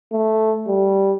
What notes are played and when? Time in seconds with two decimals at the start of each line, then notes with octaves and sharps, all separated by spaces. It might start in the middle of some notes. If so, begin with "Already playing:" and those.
0.13 A3
0.67 G3